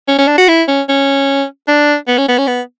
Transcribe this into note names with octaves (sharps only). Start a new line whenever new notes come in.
C#4
C#4
D4
F#4
E4
C#4
C#4
D4
B3
C#4
B3
C#4
B3